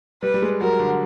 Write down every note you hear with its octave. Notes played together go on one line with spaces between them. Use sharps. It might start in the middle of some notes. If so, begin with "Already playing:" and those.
G3 B4
G3
G#3
F#3 A#4
D3